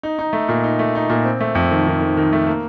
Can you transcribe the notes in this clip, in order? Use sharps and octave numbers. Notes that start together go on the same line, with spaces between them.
D#4
D#4
A3
A#2
D#4
A3
D#4
A#2
C4
A3
F2
D#3
D#3
D#3
D#3
A3
A#3